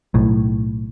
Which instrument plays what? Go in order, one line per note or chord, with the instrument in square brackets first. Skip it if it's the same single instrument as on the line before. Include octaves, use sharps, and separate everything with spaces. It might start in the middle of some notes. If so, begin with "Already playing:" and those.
[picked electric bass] B1 A2